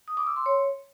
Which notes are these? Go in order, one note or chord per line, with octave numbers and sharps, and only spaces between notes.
D#6
D6
E6
C6
C#5